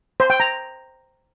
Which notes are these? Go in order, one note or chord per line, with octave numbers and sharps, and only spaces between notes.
C5
G5
A#5